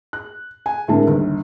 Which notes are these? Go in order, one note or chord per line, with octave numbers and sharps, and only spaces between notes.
F#6
G#5
A2 D3 G#3 C4 A#4 A5
G1 D#2